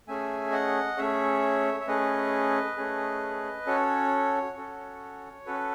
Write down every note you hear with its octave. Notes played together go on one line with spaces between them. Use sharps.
A3 C#4 G#4 E5 G#5
D#5 F#5
A3 C#4 G#4 C#5 E5
E5
A3 C#4 G#4 B4 D#5
A3 C#4 G#4
C#4 F#4 A4 C#5
C#4 F#4 A4
C#4 F#4 A4 B4